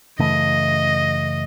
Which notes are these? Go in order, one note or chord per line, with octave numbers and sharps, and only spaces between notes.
F#2 C#3 E3 A3 D#5